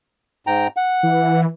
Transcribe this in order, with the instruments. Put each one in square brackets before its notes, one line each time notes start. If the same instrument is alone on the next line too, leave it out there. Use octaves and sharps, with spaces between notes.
[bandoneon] G#2 G5 A#5
F#5
[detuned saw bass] E3